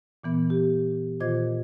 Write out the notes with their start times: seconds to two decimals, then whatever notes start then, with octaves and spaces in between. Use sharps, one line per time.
0.24 A#2 E3 B3
0.50 G4
1.20 A#2 D#3 F4 C5 D#5 G#6